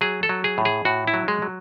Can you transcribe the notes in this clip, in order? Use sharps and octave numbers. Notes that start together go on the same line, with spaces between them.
F#3 G#4
A4
F#3
G#4
A2
G#4
A2 F#4
E4
F#3
G#3
F#3